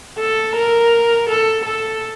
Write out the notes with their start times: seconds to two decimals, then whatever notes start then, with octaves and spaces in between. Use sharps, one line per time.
0.19 A4
0.55 A#4
1.29 A4
1.65 A4